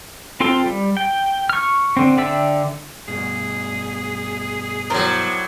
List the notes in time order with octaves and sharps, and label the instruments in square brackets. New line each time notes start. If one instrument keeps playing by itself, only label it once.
[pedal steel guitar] C4 F4 A4 G5 C6
G3
G5
C#6 F6
D3 C4
D3 D5 E5 G5 E6
[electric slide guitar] G2 B2 [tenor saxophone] G#4
[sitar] A2 F#3 [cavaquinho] A#4 C5 D5